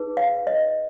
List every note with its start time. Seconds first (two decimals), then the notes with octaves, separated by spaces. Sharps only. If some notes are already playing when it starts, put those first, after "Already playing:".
Already playing: D#4 G#4 B4
0.17 F5
0.47 D#5